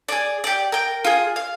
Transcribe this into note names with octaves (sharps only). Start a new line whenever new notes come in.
G#4 D5
G4 D5
A#4 G5
F4 G#4
F5